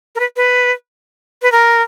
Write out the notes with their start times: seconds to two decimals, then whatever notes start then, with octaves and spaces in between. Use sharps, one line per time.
0.15 A#4
0.20 B4
0.36 B4
1.42 B4
1.52 A#4